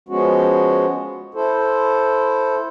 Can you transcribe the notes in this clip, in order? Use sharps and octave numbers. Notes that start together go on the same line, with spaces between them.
F3 G#3 B3 C#4 F#4
E4 A4 C5